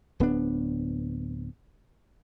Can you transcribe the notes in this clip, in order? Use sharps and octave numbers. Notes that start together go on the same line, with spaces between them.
D1 B3 D4